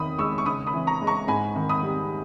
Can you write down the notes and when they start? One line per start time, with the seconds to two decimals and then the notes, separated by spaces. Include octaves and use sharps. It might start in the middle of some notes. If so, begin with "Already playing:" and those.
Already playing: E2 D#3 B5 D#6
0.18 G#3 C#6 E6
0.38 C#6
0.46 C#3 B5 D#6
0.67 B5 D#6
0.74 E3
0.87 A#5 C#6
1.02 G#3
1.07 A#5 C#6
1.28 G#2 G#5 B5
1.56 D#3
1.69 B5 D#6
1.83 G3